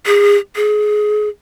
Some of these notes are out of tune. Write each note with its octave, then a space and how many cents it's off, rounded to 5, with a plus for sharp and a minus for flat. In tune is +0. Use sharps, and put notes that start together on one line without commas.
G#4 -30
G#4 +25